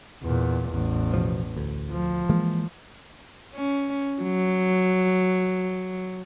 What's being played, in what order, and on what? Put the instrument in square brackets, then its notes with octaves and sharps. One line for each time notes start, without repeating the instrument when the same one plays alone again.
[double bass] E2 A#2
A1 E2
[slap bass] B2 F3
D2
[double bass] F3
[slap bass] E3 G#3 A#3
[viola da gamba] C#4
F#3